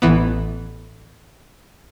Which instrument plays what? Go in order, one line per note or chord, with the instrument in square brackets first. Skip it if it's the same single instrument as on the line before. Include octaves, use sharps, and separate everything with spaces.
[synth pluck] A1 E3 B3